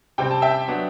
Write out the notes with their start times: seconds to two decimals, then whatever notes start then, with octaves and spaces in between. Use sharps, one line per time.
0.18 C3 G3 C4 G5
0.31 A5
0.42 E5 G5
0.68 F#3 B3 D4